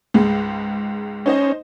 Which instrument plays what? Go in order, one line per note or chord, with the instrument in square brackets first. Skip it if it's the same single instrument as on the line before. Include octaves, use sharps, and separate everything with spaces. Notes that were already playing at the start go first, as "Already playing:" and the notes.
[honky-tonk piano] C#2 G#2 G#3
[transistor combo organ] C#4 [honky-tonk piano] D#4 C5 D#5